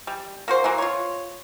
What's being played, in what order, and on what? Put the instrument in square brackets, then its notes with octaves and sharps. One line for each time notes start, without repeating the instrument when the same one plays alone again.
[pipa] G3
A#3 F#4 C5
E3 F#3 A#3
F4 C#5